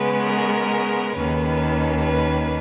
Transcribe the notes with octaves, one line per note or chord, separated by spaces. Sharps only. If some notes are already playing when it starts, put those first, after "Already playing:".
Already playing: C#3 G#3 B3 B4
A#4
D#2 D#3 A#3 C#4 B4
B4